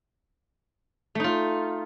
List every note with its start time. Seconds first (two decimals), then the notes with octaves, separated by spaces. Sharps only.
1.15 A3
1.20 D#4
1.24 F4